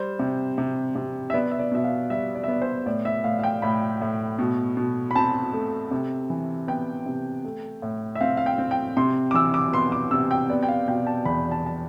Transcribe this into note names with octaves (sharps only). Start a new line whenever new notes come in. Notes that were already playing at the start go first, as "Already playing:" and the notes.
Already playing: G3 C5
C3
C3
C3
E5
B3 D5
E5
D5
B2 E5
F5
G3 E5
D5
E5
B3 D5
C5
A2 D5
E5
A2 F5
F5
G5
A2 B5
A2
B2
B2
B5
C4 A5
A3
C3
E3
B3 G5
C3
A3
A2
E5
C4 F5
F5
G5
C4
G5
C3 C6
D6
E3 E6
D6
B3 C6
D6
C3 E6
G5
B3 D5
G5
F5
B2 G5
A5
E2 B5
A5
A5